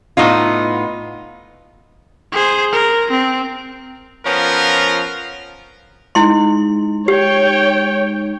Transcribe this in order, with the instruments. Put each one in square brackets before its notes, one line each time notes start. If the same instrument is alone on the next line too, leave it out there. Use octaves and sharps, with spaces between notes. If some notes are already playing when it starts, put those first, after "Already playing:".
[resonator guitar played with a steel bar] A2 B3 D#4 F4
[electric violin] G#4 C5
A#4
C4
[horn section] F3 B3 C#4 F4 A#4
[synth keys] G#3 D#4 [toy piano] E4 C6
[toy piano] G4 [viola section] C#5 G5